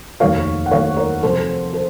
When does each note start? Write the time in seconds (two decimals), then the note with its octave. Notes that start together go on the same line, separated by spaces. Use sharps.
0.20 F1 D#2 D#3 F#3 A3 C#5 F5
0.66 F#5
0.71 F1 D#2 D#3 F#3 A3 C#5 F5
0.97 A#4 C#5
1.23 F1 F2 C3 F#3 C4 A4 C5
1.73 A4 C5